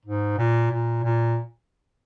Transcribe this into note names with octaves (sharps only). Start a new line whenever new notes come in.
G#2
A#2
A#2
A#2